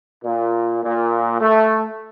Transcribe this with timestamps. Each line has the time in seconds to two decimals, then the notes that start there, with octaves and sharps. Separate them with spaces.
0.25 A#2
0.84 A#2
1.41 A3